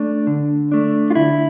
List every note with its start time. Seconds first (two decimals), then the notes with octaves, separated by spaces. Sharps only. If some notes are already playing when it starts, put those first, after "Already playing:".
Already playing: A3 D4
0.27 D3
0.72 A3 D4
1.10 F4
1.15 D3 E4